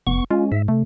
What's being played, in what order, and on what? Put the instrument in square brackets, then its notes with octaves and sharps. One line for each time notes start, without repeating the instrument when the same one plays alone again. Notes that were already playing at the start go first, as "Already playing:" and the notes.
[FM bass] F1 [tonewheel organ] B3 C#6
[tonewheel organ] G#3 C#4 [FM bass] F4
[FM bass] G#2 [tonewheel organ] E5
[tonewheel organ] C3 [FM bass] A3